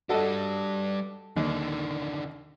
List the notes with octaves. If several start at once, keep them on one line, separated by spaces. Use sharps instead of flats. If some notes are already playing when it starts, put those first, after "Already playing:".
G3 D4 F#4 A4 D#5
D#2 D3 D#3